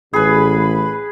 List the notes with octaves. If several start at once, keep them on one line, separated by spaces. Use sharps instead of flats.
A1 G#4 B4 B5